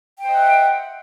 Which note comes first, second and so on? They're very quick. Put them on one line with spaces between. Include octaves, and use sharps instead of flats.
G5 C5 D#5 F#5 E5